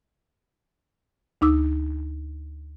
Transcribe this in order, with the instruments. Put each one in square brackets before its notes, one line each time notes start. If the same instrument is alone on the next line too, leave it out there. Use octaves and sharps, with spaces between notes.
[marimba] D2 D#4 D6 E6